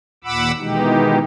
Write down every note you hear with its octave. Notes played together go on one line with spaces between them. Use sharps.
D#2 A#2 F#5 B5 D6 E6
B2 D#3 E3 G#3 D#4 G4